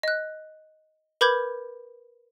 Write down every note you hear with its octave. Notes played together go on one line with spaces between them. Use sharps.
D#5 F#6
A#4 B4 B5 D6 G6 G#6